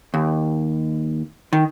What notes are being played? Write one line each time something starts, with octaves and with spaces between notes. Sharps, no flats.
D#2
D#3